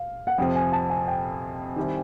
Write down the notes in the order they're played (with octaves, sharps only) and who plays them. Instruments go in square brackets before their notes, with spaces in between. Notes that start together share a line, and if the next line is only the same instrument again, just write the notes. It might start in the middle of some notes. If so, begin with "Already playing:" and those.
Already playing: [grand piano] F5
F#5
[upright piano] F2 C3 F3 [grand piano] G5
[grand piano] G#5
A5
G#5
G5
[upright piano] D#3 G3 C4 E4